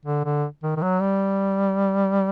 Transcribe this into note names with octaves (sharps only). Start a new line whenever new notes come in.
D3
D3
D#3
D#3
F#3
G3